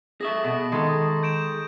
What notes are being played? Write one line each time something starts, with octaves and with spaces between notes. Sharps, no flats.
G#4 A4 E5 C#6 D#6 A#6
B2
D#3 G#3 A4
G6 D7 E7